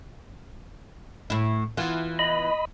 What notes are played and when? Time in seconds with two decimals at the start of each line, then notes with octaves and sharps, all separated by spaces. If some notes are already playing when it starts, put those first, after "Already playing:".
1.30 A2 E4
1.77 E3 B3 F4
2.19 D#5 B5